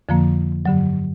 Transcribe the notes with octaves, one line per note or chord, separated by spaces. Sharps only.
F2 D3 F3 A#3
G2 D3 F#3